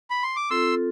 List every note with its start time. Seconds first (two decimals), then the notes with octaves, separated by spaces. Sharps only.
0.10 B5
0.23 C6
0.36 D6
0.50 C4 F4 A4 C6 E6